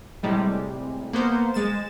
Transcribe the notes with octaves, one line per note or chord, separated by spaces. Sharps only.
A2 C3 G3 G#3
A#3 B3 C5
G#3 A6 E7